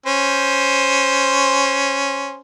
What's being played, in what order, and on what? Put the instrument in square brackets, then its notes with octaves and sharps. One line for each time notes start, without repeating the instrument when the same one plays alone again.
[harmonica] C#4 C5